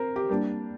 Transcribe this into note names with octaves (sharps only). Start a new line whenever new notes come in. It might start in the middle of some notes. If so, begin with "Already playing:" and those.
Already playing: C4 A#4 C5
G4
G3 A#3 D4